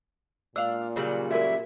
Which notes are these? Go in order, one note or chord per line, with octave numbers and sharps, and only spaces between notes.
A#2 D4 F5 E6
C#3 F#3 G3
F#4 A#4 E5